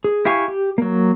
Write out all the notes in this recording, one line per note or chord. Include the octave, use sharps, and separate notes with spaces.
G#4
E4 G4 F5 G#5 C#6
G4
F#3 A#3